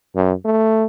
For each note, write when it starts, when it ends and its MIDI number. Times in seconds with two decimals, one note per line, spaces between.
0.15 0.33 42
0.45 0.87 57